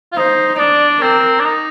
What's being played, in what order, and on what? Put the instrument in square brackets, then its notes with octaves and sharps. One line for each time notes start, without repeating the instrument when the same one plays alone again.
[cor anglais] F4
[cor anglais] D#4 [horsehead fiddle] C5
[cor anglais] D#4
[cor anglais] D4 [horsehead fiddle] D5
[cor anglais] C4 [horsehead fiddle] A#4
[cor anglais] D4
D#4